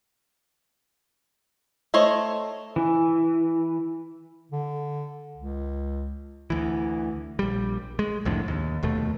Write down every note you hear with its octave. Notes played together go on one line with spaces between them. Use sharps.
A3 C5 C#5 D#5
E3
D3
C#2
D2 E3
A#1 G3
G#3
C2 F2 A2 D3
D#2
F1 D#2 B2 A3